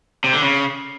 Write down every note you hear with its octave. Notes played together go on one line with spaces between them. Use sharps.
C3
D3
C#3